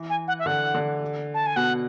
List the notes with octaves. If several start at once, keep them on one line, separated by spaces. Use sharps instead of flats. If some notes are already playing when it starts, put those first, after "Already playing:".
Already playing: E3
G#5
F#5
E5
D3 F#5
D3
A5
G#5
B2 F#5